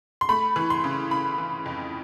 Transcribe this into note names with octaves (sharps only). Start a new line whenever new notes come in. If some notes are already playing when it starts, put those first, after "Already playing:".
C6
A3 B5
E3
C6
C#3
C#3 B5
E3
F2